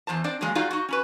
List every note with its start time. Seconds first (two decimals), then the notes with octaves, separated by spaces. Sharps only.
0.07 E2 G2 E3 C5 A5
0.24 C4 D4 C5 D5
0.41 D3 F3 F#3 G#3 A#3
0.55 D#4 F4 F#4 G#4 D5 F5
0.71 D#4 F#4
0.89 C#4 F#4 B4